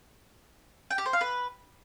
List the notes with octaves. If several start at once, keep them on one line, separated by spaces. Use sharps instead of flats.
G5
G4
C5
F5
B4